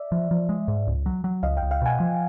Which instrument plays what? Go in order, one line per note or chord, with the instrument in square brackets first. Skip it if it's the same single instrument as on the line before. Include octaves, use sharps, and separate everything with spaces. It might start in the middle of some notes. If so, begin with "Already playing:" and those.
Already playing: [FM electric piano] D5 E5
[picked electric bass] F3
F3
G#3
G#2
C#2
F#3
F#3
[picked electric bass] C#2 [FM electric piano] D#5 F5
[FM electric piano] F5 G5
[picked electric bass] C#2
[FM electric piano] F5 G5
[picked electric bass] B2 [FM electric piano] F#5 G#5
[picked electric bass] F3